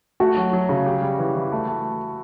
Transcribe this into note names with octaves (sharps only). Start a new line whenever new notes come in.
A3 F#4
F#3
F#3
C#3
G4
G3
E3
E3
A3
A3